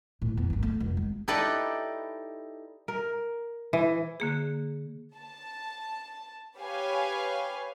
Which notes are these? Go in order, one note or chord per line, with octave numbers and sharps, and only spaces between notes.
A2
E2
D1 G#1
A3
F1
G#3
D#4 E4 G4 A4 B4 D5
A#4
E3
D3 A#3 G#4
A5
G4 B4 C#5 F5 G#5